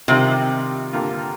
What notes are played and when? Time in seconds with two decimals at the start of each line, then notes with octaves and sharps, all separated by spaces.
0.08 C3 D#3 G3 C4 F4
0.93 G2 D3 G3 A#3 F4